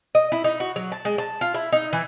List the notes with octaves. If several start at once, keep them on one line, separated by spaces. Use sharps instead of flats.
D#5
E4
D#4
F#4
F#3
A5
G#3
A5
F4
E4
D#4
E3